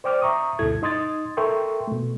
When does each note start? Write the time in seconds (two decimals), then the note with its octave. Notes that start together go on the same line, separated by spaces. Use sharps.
0.04 C5 D5 G5 D6 F6
0.22 E5 A#5 C#6 D#6
0.59 D2 G2 B2 E4 A4 G#6
0.82 D#4 D#5 C6 D#6 G#6 A6
1.37 A4 A#4 E5 G5 C6 C#6
1.88 B2 A3